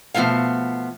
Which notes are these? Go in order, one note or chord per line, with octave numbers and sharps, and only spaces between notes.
B2 F3 A3 B3 F5